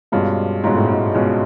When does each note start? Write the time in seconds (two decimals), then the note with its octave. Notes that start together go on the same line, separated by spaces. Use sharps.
0.12 G2 B2 G#3 C#4 F4
0.64 G#2 B2 G#3 C#4 F4
0.76 A2
0.88 G#2
1.15 B2 G#3 C#4 F4